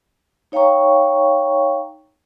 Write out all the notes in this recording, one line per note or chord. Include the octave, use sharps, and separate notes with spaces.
D#4 C#5 F5 G5 A#5 C#6